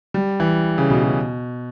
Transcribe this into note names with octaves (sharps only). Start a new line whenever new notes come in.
G3
E3
C#3
B2
B2